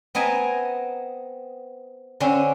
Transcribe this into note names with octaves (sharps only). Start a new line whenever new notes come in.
B3 C4 D#5 G#5 A#5
D3 C4 C#4